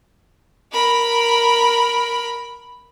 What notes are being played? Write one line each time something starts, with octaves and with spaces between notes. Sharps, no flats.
A#4 B5